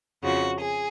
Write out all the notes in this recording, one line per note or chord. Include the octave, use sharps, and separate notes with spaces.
F2 C#3 F3 F#4
G#4